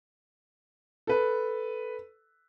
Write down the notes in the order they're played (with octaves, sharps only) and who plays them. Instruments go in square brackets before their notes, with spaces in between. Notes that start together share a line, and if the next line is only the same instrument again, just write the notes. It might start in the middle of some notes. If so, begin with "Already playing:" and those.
[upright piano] A4 B4